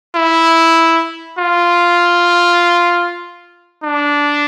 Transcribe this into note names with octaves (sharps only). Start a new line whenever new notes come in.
E4
F4
D4